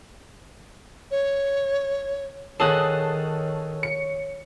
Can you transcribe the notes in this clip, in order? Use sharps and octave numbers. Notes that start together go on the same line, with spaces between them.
C#5
D#3 G#4 A4 C#5 F#5 A5 D#6 F#6
C#7